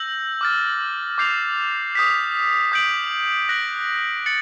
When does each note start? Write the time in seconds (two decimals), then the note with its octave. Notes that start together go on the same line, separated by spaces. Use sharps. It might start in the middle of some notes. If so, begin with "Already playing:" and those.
Already playing: E6 G6 A#6 F#7
0.41 D6 F6 A6
1.18 D6 G6 C7 F7
1.95 D#6 G6 B6
2.72 D#6 G6 B6 D7 F#7
3.49 F#6 A#6 D7 F#7
4.26 A6 C#7 F#7